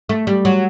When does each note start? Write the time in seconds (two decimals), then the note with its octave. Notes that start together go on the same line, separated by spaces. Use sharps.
0.09 A3
0.27 G3
0.45 F#3